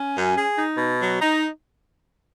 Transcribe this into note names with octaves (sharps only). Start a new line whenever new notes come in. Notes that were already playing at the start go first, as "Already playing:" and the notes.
Already playing: C#4
F#2
G#4
D#4
B2
F#3
D#4